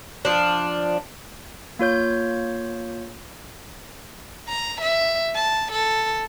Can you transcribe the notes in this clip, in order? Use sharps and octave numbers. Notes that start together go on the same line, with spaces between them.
F3 D4
A#3 F4 C#5 G6
A#5
E5
A5
A4